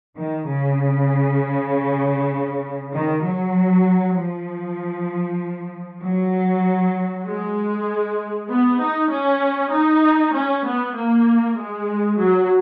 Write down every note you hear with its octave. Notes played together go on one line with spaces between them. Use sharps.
D#3
C#3
D#3
F#3
F3
F#3
G#3
B3
D#4
C#4
D#4
C#4
B3
A#3
G#3
F#3